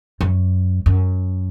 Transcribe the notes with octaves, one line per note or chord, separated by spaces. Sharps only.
F#2
F#2